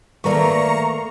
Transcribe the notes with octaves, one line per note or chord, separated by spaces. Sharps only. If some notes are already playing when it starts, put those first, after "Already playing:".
D#3 A3 A#3 B4 D5 A#5 C#6